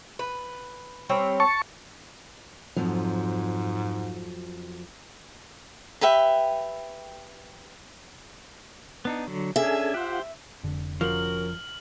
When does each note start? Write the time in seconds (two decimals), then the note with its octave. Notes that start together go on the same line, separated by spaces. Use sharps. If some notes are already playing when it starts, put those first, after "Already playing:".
0.19 B4
1.09 G3 C4 C#5
1.40 A5 C#6
2.76 F2 G#2 F3 F#3
6.01 G4 B4 E5 G5
9.05 B3 D4 D#4
9.27 D3 F#3
9.56 C#4 D4 G#4 A4 E5 G#5
9.94 F4 G4 C5 F#5
10.64 F1 D3
11.01 F3 C#4 F#4 A#4 F6 F#7